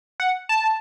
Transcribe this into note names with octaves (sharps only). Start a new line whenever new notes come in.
F#5
A5